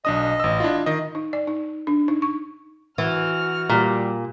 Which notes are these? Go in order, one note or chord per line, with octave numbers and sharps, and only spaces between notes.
B1 D4 D#5 D#6
A1 E6
D4 E4 F4
D#3 D#5
D#4
D5
D#4
D4
D#4
C#6
E3 F#4 F6
A#2 G3